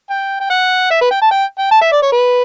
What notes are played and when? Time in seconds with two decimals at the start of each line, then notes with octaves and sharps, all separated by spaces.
0.10 G5
0.41 G5
0.50 F#5
0.91 E5
1.01 B4
1.11 G5
1.22 A5
1.31 G5
1.59 G5
1.71 A5
1.82 E5
1.92 D5
2.03 C#5
2.12 B4